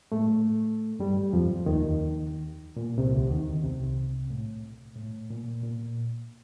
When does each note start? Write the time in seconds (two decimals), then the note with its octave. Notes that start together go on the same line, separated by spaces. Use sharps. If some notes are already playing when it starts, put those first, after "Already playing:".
0.12 A2 A3
1.00 G2 G3
1.33 F2 F3
1.66 D#2 D#3
2.77 A#2
2.98 C2 C3
3.15 D2 D3
3.31 D#2 D#3
3.64 C2 C3
4.30 A2
4.96 A2
5.30 A#2
5.63 A#2